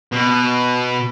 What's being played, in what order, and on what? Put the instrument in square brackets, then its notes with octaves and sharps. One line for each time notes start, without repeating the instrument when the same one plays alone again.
[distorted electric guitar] B2